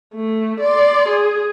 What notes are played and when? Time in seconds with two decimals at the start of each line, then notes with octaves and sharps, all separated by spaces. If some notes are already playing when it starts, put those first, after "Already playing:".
0.14 A3
0.60 D5 C6
1.09 G#4